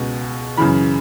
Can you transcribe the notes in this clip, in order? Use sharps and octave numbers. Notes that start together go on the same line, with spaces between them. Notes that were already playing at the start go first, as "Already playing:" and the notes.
Already playing: C#2 B2
F#2 C#3 E3 B5